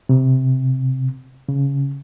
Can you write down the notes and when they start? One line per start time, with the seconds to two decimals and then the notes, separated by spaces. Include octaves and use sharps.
0.09 C3
1.49 C#3